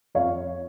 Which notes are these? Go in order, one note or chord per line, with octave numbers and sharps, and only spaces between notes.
F2 C#5 F5